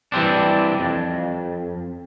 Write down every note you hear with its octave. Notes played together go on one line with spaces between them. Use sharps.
E3 G3 C4 D4
F2